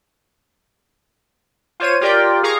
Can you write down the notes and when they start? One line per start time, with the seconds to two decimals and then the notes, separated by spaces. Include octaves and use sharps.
1.80 F4 C5 C#5 D#7
2.01 F4 G4 A#4 D5 G5
2.43 G#4 F5 A#5 C#6